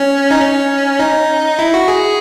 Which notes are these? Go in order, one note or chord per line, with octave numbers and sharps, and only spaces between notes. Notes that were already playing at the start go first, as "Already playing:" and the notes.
Already playing: C#4
D#4
C#4
D#4
E4
F#4
G#4